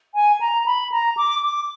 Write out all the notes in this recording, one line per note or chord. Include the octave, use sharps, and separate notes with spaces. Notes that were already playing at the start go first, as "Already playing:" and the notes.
G#5
A#5
B5
A#5
D6
D6